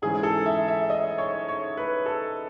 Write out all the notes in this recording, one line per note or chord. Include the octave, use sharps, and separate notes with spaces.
G#2 E3 G#3 C#4 G#4
A4
E5
E5
D#5
C#5
C#5
B4
A4